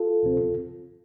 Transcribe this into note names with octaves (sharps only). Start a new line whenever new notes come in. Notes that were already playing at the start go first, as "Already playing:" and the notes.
Already playing: F4 A4
D2 C3 F3 C4